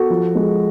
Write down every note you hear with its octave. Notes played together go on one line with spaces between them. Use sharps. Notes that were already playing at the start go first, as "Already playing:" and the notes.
Already playing: F#4 A4
F3
G#3